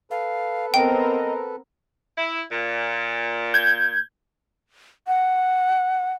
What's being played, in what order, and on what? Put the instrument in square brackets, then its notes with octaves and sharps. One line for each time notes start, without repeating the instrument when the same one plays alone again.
[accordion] A4 B4 [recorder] F5
[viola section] B3 C4 A#4 [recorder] D#5 [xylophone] G5
[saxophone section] E4
A#2
[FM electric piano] G6 G#6
[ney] F#5